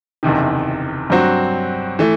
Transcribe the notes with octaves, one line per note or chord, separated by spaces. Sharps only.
F#1 E2 C3 D#3
G2 F#3 C4 F#4
E3 A3